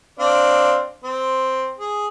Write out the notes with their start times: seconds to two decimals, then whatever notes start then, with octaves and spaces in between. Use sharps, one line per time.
0.20 C4 D4 F5
1.04 C4
1.78 G#4